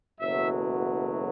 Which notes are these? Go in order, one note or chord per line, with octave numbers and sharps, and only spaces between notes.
F#1 E2 B2 F#3 A3 E5